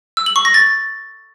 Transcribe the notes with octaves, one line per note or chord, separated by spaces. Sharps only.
E6
F#7
C#6
A#6
A6